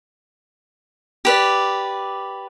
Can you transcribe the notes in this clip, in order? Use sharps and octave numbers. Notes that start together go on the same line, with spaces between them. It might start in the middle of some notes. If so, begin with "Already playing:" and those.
G4 B4 D5